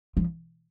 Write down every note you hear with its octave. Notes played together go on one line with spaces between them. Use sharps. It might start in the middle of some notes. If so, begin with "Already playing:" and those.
F3